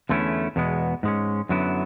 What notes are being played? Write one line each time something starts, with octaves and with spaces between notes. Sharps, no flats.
E2 D3 A3 C#4 E4
E2 B2 G#3 B3
G#2 G#3 C#4
F#2 D3 F#3 B3 E4